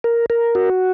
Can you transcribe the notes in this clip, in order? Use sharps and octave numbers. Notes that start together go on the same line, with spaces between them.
A#4
A#4
F#4